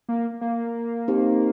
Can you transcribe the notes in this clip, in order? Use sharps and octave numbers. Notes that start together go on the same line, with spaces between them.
A#3
A#3
C4 D#4 G4 C5